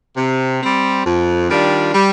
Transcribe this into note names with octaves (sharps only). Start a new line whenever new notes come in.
C3
G3 C4
F2
D#3 G3 D4 F4
G3